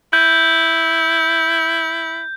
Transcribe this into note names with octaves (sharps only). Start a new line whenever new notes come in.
E4 G6